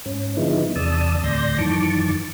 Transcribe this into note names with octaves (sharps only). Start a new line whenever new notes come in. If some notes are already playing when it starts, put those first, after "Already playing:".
G#2 C#4
D3 F3 G#3 B3 D#4 E4
E2 C3 D5 A5 D#6 E6
D2 A2 D5 C6 G6 A#6
F#2 D#3 E3 A5 C#6 D6